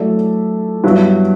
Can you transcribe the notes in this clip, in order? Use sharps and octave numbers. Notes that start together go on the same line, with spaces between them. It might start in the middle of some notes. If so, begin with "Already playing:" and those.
Already playing: F#3 A3 E4 A4 D5
G2 F#3 B3 E4